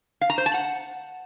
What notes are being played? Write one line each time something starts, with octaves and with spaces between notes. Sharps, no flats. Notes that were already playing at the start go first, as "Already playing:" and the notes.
F5
A#5
C5
A5
F#5